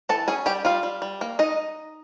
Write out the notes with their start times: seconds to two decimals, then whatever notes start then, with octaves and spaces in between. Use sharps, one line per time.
0.09 E3 A4 A5
0.28 C#4 G#4 G#5
0.46 G3 G4 G5
0.65 G3 F4 F5
0.83 G3
1.02 G3
1.21 A#3
1.39 D#4 D#5